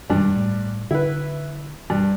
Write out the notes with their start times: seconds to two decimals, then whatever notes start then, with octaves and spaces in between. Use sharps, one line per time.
0.10 F#1 G2 D#3 G#3 D4
0.36 A2
0.91 D3 E4 B4
1.90 G2